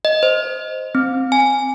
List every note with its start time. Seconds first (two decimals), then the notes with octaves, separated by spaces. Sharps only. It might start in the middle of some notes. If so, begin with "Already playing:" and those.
0.05 D#5
0.23 C5
0.95 C4
1.32 G#5